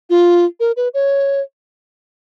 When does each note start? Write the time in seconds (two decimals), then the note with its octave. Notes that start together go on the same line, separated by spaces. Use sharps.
0.10 F4
0.60 A#4
0.77 B4
0.94 C#5